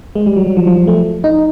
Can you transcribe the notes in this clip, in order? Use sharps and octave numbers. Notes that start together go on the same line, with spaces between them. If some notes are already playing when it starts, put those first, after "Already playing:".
G#3
G3
F#3
F#3
F3
F3
A3
D#4